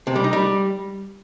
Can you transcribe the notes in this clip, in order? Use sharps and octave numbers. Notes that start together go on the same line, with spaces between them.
C3
G3
D#4
G3